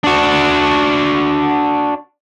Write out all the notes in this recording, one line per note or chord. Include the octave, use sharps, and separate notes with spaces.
D4 F#4